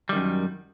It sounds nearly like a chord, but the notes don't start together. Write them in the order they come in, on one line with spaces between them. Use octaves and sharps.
G3 D#3 F#2